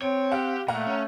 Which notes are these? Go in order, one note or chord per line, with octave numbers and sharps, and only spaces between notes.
C4 C#5 D7
G4 F5 F#5
A#2 A3 F5 F#5 A#5
C#4